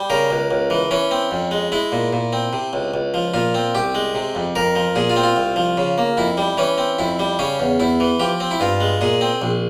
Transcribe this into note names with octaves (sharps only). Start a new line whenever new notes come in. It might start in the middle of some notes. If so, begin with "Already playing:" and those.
Already playing: G3
C#3 A#4
C#2
C#2
E3
E3 C#4
C4
F2
G#3
G#3 E4
A#2
A#2
C4
C3
C#2
C#2
F3
A#2 F4
C4
C2 G4
G#3
C3
F2
F2 A#4
F3
A#2 G#4
F4
C4
F4
C2
F3
C#3
A#3
F2 E4
G3
E3 C#4
C4
F2 E4
G3
C#3 C#4
E2
E2 E4
E3
F3 G4
C4
E4
G2 F4
G#3
A#2 G#4
C4
A#1